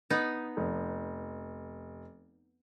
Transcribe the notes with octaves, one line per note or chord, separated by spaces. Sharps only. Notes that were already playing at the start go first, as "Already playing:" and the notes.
B3 D#4
F1